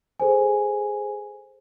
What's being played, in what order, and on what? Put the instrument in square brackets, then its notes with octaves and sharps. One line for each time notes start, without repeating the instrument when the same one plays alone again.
[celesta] G#4 A4 C5 G#5